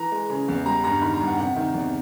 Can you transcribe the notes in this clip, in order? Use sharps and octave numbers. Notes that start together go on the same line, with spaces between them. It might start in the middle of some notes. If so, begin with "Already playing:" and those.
Already playing: E3 A#5
G#3
C#3
E2
G3 A#5
G2 A#5
D#3 B5
A#5
G2
F#5
C3 F#5
D#3
E2